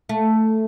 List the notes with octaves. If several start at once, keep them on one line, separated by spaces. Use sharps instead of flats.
A3